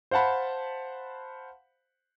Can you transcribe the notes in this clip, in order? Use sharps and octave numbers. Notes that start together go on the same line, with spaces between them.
C5 F5 F#5 A5 B5